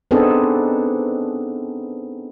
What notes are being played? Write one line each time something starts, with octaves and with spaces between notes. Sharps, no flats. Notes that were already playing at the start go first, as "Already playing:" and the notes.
B3 C4 D4 D#4 G#4 A4